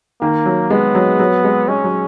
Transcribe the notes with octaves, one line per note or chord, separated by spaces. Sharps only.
D#3 A#3
F#3
G#3 B3
F#3
F#3
G#3
G#3 C#4
F#3